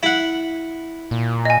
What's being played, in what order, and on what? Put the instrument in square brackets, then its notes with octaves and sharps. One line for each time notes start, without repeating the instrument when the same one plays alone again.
[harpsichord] E4 F#5
[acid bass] A#2
[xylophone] D#5 G#5